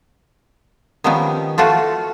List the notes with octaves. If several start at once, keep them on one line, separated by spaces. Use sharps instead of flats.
D#3 F3 G3 B3 C#4 D#4
A3 F4 F#4 A4